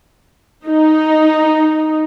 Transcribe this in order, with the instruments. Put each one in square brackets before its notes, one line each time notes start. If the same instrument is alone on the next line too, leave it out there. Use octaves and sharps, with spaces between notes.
[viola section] D#4